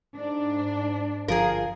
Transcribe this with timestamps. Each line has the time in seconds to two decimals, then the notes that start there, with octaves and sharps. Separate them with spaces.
0.15 G#2 D4
1.28 G1 F3 G#4 A#4 F5